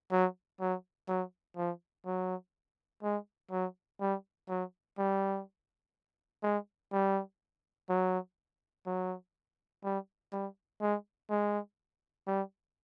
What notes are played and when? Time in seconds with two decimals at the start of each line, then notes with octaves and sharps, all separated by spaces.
0.11 F#3
0.60 F#3
1.08 F#3
1.57 F3
2.06 F#3
3.03 G#3
3.51 F#3
4.00 G3
4.49 F#3
4.98 G3
6.43 G#3
6.92 G3
7.89 F#3
8.86 F#3
9.84 G3
10.32 G3
10.81 G#3
11.30 G#3
12.27 G3